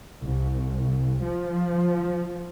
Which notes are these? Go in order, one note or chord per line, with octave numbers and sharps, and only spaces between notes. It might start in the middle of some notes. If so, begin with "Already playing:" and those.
C2
F3